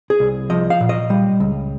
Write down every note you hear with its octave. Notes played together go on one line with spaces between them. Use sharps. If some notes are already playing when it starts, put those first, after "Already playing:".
G#4
C2
F3 D#5
F5
A#2
D#5
G3
C#2